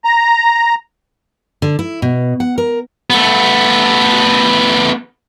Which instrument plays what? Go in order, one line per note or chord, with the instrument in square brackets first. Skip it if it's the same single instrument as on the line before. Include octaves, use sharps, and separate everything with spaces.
[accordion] A#5
[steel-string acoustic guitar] D3
E4
B2
F#5
A#4
[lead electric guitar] A3 B3